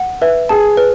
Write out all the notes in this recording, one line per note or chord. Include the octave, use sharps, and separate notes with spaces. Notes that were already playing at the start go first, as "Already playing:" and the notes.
Already playing: F#5
B4 E5
G#4 A5
B4